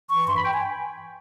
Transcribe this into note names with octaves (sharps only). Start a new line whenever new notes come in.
E3 C#6
G2 C6
B5
G5
G#5